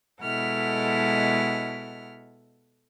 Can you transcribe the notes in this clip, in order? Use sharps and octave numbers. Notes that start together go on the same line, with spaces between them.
B2 G#3 E4 A4 F#5 F6